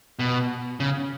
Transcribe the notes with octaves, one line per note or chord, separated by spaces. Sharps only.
B2
C#3